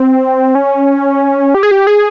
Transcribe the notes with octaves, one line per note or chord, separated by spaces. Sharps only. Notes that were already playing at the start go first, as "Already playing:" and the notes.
Already playing: C4
C#4
G4
G#4
G4
G#4